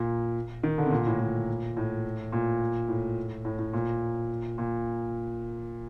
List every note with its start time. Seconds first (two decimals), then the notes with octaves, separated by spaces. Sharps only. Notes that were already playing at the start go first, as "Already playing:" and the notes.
Already playing: A#2
0.63 D#3
0.78 D3
0.86 C3
0.91 A#2
1.07 A2
1.20 A#2
1.77 A2
2.32 A#2
2.89 A2
3.45 A2
3.59 A2
3.73 A#2
4.58 A#2